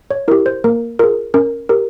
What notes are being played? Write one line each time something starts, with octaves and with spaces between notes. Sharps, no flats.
C#5
E4 G4 A#4
C5
A#3 A#4
F4 G#4 A#4
C#4 A#4
G4 A#4